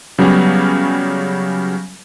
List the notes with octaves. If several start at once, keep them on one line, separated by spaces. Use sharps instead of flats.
C#3 F#3 G3 B3 C#4